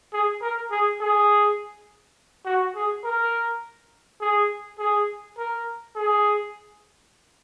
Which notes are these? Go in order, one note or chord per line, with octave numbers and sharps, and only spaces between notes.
G#4
A#4
G#4
G#4
F#4
G#4
A#4
G#4
G#4
A#4
G#4